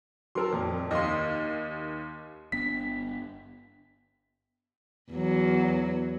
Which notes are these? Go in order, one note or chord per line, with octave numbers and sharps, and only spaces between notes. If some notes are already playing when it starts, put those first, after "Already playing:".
F#3 A#4 A5 C6 E6
F2 A#2
D#2 D#5 F5 C6
G1 B3 D4 B6
E2 F#3